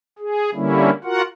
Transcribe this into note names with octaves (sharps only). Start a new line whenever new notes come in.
G#4
D3 G3 A#3 C#4 E4
F4 F#4 A#4 F#5